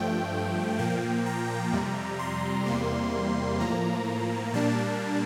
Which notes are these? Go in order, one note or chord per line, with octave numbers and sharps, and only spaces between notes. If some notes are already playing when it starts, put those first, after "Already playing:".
Already playing: G2 F3 A3 G5
A#2 F3 A#3 G5
A#5
F2 C3 G3
C6
E2 C3 G3 A#3
A2 F3 A#3 A#5
A#2 G3 A#3 D4 A5